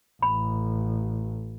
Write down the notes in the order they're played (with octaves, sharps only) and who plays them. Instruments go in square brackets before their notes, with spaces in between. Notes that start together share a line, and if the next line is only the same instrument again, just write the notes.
[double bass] A1 [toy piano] B5